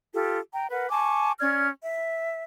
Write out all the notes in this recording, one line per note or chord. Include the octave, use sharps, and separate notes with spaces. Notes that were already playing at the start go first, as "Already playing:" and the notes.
F4 G4 A4
G5 A#5
A#4 B4 F#5
G#5 A5 C#6 D6
C#4 D5 F6 G#6
E5